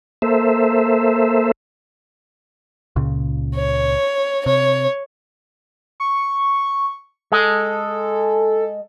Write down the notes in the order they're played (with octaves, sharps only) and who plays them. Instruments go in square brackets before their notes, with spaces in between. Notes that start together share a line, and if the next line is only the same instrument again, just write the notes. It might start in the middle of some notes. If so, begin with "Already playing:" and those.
[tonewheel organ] A#3 A4 C5 E5
[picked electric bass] C#2 A#2 C#3
[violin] C#5
[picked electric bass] C3 [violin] C#5
[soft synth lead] C#6
[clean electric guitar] G#3 [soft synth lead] A4